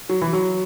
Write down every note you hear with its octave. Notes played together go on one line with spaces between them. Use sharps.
F#3
E3
F#3